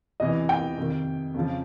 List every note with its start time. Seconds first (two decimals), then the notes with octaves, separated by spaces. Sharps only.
0.20 E2 C3 E3 D#5
0.49 G5
0.78 F2 C3 D#3
1.34 F2 C#3 F3